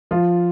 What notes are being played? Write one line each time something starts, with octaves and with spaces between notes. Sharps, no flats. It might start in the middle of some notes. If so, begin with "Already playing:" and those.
F3 F4